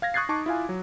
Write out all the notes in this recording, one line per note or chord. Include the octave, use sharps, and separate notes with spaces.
F5 G#6 A#6
C#6 D#6 F#6 G#6 A6 C7
D#4 A5 C#6 D6
E4 F4 F5 G#5
F#3